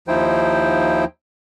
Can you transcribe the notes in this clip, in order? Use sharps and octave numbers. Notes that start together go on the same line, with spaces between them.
D#2 F3 D#4 E4 C5 G5